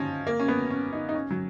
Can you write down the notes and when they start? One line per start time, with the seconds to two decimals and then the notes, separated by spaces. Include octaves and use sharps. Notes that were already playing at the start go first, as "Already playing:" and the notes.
Already playing: F3 C#4 D#4
0.27 A#3
0.40 C#4
0.48 B3
0.70 C#4
0.93 D#4
1.09 D#4
1.14 C#4
1.31 F#3